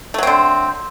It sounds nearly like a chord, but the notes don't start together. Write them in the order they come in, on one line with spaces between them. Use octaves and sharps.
A3 F#3 C4 D3